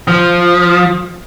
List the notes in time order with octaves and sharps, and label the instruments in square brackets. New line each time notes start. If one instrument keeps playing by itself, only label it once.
[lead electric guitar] F3